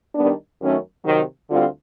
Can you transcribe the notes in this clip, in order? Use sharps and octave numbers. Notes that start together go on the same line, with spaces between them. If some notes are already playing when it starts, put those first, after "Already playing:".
D#3 G3 B3 D4
F#2 D#3 F#3 A3 C#4
C3 D#3 F#3
D2 D3 G3 C4 F4